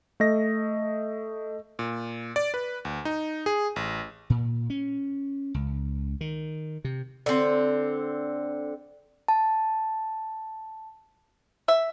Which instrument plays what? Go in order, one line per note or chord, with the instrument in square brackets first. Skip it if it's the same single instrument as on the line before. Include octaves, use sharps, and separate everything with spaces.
[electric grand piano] A3 D#5 A#6
A#2
D5
B4
D2
D#4
G#4
A1
[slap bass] A#2
C#4
C#2
D#3
C3
[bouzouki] D3 C4
[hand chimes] A5
[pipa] E5